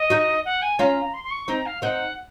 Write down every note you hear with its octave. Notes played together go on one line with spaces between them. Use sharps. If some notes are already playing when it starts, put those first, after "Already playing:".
Already playing: D#5
D#4 F#4
F#5
G#5
C#4 F4 A#5
C6
C6
C#6
C4 D#4 A#5
F5
C4 D#4 F#5